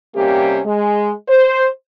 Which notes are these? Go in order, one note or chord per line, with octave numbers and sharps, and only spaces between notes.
C3 G3 A#3 C#4 G4
G#3
C5